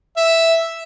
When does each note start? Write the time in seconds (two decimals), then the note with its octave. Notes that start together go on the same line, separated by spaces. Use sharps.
0.17 E5